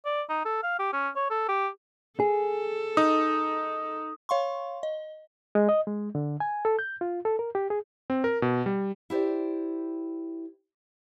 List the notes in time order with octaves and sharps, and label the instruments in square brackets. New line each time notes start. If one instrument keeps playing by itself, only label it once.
[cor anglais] D5
D#4
A4
F5
G4
C#4
C#5
A4
G4
[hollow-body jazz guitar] G#4 [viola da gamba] A4
[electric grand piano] D#4 [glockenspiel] D#6
[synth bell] C#5 F5 C6 C#6
D#5
[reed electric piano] G#3
D#5
G#3
D3
G#5
A4
G6
F4
A4
A#4
G4
G#4
[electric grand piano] C4
A#4
B2
G3
[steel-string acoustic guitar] E4 G4 C5 D5